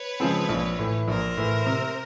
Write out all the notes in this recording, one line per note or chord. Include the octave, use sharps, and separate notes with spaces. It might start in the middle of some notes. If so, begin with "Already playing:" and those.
Already playing: B4 C#5
C#3 F3 G#3 C4
A#1
A2 E3
A#1 A#4 C5
A2 E3
C3